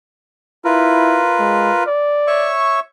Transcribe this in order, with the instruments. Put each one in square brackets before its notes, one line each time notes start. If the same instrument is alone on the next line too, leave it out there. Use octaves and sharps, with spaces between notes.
[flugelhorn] E4 [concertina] F4 A#4 B4
[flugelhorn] G#3
D5
[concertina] C#5 E5 C#6